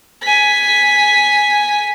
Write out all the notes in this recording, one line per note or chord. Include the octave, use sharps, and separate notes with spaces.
G#5 B6